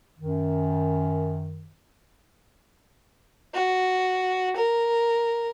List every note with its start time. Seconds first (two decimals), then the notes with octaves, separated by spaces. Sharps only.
0.18 F#2 D#3
3.54 F#4
4.56 A#4